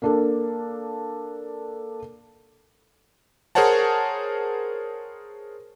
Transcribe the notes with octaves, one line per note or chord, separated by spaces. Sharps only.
A#3 D4 A4
G#4 A#4 C5 C#5 F#5 A5